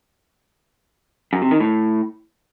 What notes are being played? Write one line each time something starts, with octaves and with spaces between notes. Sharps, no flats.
F#2
C3
D#3
A2